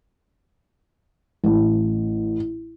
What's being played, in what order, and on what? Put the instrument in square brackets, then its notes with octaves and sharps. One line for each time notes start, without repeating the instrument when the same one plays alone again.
[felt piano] A1